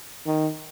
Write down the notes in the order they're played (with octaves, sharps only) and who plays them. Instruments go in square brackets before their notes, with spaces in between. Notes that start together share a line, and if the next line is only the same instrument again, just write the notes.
[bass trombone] D#3